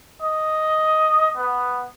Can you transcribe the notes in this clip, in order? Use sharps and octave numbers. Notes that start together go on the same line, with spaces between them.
D#5
B3